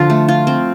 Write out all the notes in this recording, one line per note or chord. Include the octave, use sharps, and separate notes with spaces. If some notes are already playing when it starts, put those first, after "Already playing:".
Already playing: D3 F3 F4
A3
F4
C4